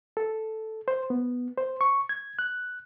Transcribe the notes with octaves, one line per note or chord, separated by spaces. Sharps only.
A4
C5
B3
C5
C#6
G#6
F#6